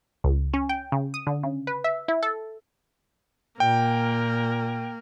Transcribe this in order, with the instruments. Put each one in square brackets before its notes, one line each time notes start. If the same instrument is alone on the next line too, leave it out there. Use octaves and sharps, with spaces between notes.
[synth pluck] C#2
C#4
G5
C#3
D#6
D3
C#3
B4
E5
E4
A4
[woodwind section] A#2 [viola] A#3 A#4 [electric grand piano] G5